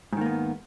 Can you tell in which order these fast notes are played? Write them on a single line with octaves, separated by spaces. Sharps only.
G#2 D#3 A#3 B3